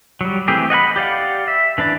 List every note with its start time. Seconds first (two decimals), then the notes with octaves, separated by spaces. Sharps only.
0.21 F#3 G3
0.48 E3 A3 C4 G4 G#4
0.70 D#5 F#5 G#5 B5
0.96 G4 D5 F5 F#5
1.48 E5
1.78 E3 D4 B4 D5